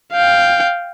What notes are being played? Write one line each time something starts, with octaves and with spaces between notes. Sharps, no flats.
F5 G5